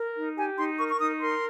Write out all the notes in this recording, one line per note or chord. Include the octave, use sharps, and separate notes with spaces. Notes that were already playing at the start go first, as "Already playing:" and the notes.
Already playing: A#4
D#4
G4 G#5
D#4 C6
A#4 C#6
C#6
D#4 D#6
A#4 C6